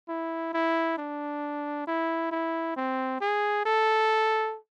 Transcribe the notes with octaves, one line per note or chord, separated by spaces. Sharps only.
E4
E4
D4
E4
E4
C4
G#4
A4